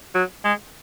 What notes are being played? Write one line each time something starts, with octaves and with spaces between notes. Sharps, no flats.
F#3
G#3